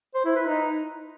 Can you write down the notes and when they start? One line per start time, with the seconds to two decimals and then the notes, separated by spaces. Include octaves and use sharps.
0.15 C5
0.25 E4
0.36 B4
0.47 D#4